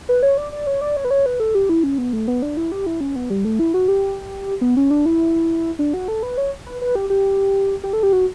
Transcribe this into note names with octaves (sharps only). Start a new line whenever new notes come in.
B4
C#5
D5
D5
C#5
D5
C#5
B4
C#5
B4
A4
G4
E4
C#4
B3
A3
B3
D4
E4
G4
E4
C#4
B3
G3
A3
E4
F#4
G4
B3
C#4
D4
E4
D4
F#4
A4
B4
C#5
B4
B4
G4
G4
G4
A4
G4
F#4